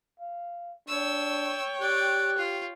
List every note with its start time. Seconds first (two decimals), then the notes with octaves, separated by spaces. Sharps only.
0.20 F5
0.89 D4 C#5 G5 E6
1.82 G4 D5 F#6
2.38 F4